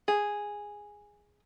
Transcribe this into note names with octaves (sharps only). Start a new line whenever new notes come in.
G#4